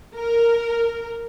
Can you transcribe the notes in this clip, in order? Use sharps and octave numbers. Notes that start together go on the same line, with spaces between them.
A#4